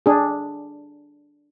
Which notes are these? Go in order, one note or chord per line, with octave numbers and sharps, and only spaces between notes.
D4 G#4